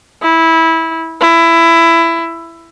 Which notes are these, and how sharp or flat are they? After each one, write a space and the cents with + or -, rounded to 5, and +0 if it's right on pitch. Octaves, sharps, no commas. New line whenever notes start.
E4 -15
E4 +15